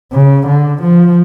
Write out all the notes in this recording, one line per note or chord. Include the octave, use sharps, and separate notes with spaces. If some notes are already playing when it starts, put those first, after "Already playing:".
C#3
D3
F3